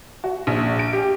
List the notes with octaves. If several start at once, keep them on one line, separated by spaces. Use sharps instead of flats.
F#4
A#1
D7
G4